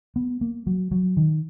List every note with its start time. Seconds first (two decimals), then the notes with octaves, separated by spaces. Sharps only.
0.16 B3
0.41 A#3
0.67 F#3
0.91 F#3
1.17 D#3